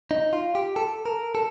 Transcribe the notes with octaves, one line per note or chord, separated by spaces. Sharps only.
D#4
F4
G4
A4
A#4
A4